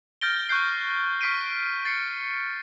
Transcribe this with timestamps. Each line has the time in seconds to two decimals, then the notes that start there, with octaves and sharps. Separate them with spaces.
0.21 F6 G6 A6 A#6 D7 G7
0.49 C#6 F#6 G6 C7
1.21 C#6 F6 B6 C7 D7 D#7
1.85 A6 C7 C#7